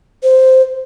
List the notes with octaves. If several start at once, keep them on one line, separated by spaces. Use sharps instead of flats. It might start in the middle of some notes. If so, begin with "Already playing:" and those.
C5